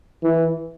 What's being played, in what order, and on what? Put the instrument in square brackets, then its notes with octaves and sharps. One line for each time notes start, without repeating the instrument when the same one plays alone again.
[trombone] E3